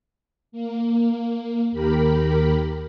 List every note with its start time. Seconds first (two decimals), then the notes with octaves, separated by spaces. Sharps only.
0.52 A#3
1.72 D#2 G4 A#4 B5